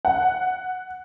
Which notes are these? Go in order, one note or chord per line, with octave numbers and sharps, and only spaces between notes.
F#5